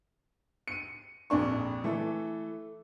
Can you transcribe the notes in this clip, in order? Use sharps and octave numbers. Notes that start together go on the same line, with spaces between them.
C#7 D#7
A#1 F2 D4 C#6
E3 A3 A4